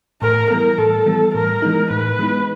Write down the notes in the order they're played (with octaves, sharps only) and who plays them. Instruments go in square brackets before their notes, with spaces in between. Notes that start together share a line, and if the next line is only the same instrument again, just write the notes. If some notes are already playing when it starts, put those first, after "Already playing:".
[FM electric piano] A2 [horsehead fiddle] A#4
[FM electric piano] E3 G3 B3 [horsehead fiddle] A#4
[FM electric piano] A2 [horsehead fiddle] A4
[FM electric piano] E3 G3 B3
[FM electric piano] A2 [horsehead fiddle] A#4
[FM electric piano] E3 G#3 B3 D#4
[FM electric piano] A2 [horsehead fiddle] B4
[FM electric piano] E3 G#3 B3 D#4